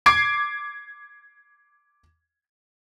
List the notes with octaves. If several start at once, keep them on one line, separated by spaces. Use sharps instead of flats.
D6 G#6 C7 D7